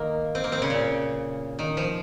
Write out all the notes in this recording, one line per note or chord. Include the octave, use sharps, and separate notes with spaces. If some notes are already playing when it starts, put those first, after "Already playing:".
Already playing: D#3 A#3
C4
A#3
C4
C#3
A#2
D#3
F3